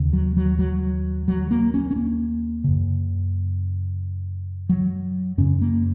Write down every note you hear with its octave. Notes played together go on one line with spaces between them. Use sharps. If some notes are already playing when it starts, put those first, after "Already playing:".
Already playing: D#2 C#3
F#3
F#3
F#3
F#3
A#3
C#4
C#4
A#3
F#2 C#3
F#3
F#2 C#3 C#4
A#3